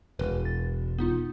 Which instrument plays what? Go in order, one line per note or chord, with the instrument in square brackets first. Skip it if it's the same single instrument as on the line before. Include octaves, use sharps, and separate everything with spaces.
[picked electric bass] E1 [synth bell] B4
[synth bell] A6
B3 D#4 F4